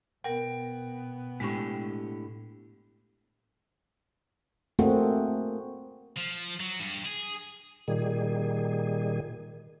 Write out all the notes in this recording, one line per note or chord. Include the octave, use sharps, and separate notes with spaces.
B2 B3 A#4 F#5 G5
A2 D3 G#3 G4 C#6
A3 A#3 C4 F#4 G#4
F3
F#3
G2
G#4
A#2 D#3 G3 G#4